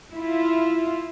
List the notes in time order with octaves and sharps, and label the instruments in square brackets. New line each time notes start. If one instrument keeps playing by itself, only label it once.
[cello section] E4 F4